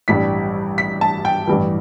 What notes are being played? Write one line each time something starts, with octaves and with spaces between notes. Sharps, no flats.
A1 G2 G3 D4 B6
B6
A5
G5
A1 G2 E3